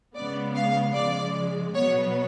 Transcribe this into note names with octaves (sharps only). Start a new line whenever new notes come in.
C#3 G#3 B3 D5
F5
C#3 F3 G#3 D5
B2 F#3 B3 C#5